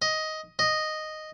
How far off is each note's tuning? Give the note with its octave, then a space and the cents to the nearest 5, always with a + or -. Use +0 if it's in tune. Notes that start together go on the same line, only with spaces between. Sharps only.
D#5 +10
D#5 -5